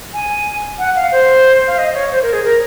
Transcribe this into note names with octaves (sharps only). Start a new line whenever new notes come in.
G#5
F#5
F5
C5
F5
D#5
C#5
C5
A#4
G#4
A#4